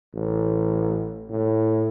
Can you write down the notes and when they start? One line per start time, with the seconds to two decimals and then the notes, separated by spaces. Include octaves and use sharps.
0.14 A1
1.31 A2